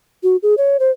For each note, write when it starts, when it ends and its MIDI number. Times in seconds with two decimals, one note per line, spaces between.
0.23 0.36 66
0.43 0.55 68
0.58 0.77 73
0.80 0.91 72